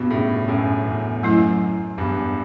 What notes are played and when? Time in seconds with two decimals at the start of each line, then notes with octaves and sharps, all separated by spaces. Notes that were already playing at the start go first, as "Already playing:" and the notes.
Already playing: G2 B2 B3 F#4
0.10 A2 C#3
0.48 F#2 A2
0.86 E2
1.23 F#2 F#3 A3 E4
1.98 E2 G2